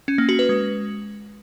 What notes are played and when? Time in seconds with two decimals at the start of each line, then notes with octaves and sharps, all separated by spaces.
0.08 C#4
0.18 A#3
0.29 F#4
0.39 B4
0.49 G#3